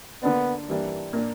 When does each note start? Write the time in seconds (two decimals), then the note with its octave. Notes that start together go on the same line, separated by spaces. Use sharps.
0.23 D3 A#3 B3 D4
0.68 G2 E3 G3 A#3 D4
1.13 A#2 A#3 D4